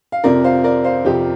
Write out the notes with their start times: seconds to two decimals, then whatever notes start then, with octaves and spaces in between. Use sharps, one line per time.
0.12 F5
0.24 F2 C3 F3 A#4 D5
0.44 C5 F5
0.64 A#4 D5
0.84 C5 F5
1.05 F2 C3 F3 G4 C5